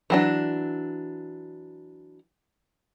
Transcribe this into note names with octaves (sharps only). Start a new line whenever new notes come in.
E3 F#3 D4